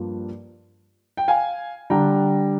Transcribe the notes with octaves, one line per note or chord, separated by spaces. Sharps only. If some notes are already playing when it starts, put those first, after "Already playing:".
Already playing: G2 F3 A#3
G5
F5 G#5
D3 G3 D4 G5 A#5